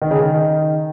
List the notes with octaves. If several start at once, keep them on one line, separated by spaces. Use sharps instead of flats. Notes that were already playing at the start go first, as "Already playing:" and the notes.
D#3
C#3
D#3